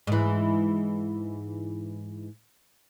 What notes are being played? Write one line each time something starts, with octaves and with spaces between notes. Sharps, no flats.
G#2 E3